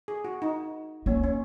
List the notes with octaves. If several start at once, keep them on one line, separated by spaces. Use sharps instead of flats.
G#4
F#4
D#4
A#3 C#4
C#4